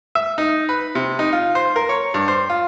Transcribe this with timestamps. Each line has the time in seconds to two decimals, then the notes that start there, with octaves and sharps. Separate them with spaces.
0.15 E5
0.38 D#4
0.69 B4
0.95 C3
1.19 D#4
1.32 F4
1.55 C5
1.76 A#4
1.89 C#5
2.14 G2
2.28 C5
2.49 F4